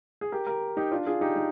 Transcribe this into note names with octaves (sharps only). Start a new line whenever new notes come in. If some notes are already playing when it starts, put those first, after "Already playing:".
G#4
G4 A#4
G4 A#4
D#4 G4
D4 F4
F4 G#4
D#4 G4
D#4